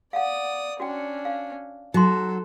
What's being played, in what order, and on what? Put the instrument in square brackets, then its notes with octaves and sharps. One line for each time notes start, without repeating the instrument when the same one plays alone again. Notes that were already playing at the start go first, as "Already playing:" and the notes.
[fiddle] D5 D#6 [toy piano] F5 F#5
[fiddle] C#4 D4 [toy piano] F#4 G5
[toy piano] F5
[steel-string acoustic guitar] F#3 [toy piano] D#4 C6 [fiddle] A4